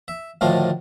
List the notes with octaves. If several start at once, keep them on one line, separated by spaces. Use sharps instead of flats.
E5
D2 A2 D#3 F3 D4 F5